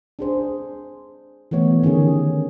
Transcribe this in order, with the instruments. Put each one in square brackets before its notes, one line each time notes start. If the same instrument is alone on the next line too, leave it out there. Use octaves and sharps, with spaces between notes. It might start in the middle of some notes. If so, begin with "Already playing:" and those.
[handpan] D4 G#4 C5
E3 A3 B3 C#5
D3 D#3 C#4 G4 G#4